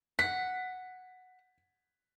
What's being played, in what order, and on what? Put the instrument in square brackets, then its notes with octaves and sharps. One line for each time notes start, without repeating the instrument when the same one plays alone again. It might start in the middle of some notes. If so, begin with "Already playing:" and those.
[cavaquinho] F#5 [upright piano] B6